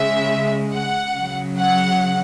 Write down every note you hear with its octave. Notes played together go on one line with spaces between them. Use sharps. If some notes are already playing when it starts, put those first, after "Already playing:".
Already playing: C#3 G#3 E5
F#5
C#3 F#3
F#5